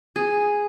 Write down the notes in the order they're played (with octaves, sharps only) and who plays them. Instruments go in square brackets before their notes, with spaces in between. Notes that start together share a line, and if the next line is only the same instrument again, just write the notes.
[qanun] G#4